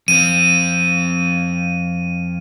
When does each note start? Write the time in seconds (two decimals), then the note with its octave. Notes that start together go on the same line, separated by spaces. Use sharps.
0.08 F2 C4 D#7